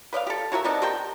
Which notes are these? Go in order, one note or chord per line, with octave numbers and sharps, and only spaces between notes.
B4 D5 D#5 F5
G4 A4
E4 F#4 A#4 E5
B3 C4 D4 D#4
G4 A#4 C5 G5